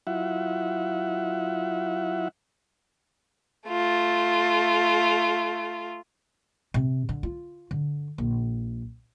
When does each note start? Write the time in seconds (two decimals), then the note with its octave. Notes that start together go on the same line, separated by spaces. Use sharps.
0.07 F#3 E4 F4 E5 F#5
3.69 A3 F4
6.74 C3
7.09 D3
7.23 F4
7.71 D3
8.18 A#1